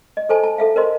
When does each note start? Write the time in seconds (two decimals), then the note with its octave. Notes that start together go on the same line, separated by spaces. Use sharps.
0.17 D#5
0.29 A4 C5 G#5 A5
0.43 A5
0.58 A4 E5 F5
0.76 A#4 C5 D#5 C6